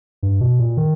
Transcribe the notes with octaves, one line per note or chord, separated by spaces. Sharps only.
G2
B2
A#2
D#3